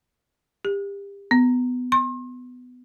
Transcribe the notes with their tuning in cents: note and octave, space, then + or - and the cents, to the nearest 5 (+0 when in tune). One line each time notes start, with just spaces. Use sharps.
G4 +30
B3 +15
C6 +40